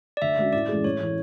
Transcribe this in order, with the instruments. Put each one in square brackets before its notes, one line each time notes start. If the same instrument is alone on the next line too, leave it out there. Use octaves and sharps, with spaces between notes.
[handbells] D5
[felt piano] D2 [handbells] E5
[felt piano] D3 G#3 C#4 F#4
[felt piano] A2 [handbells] D5
[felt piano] E3 G#3 C#4 G#4
[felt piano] A1 [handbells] C#5
[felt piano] A2 E3